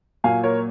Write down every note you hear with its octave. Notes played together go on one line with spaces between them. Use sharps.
A#2 F#3 A#3 F5 G#5
A#4 C#5